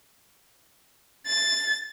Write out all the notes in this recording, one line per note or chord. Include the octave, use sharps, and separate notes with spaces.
A6